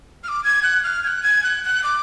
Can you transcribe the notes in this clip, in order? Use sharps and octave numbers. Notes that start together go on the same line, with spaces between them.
F6
D6
G#6
F#6
F6
G#6
F#6
G#6
F#6
F#6
D6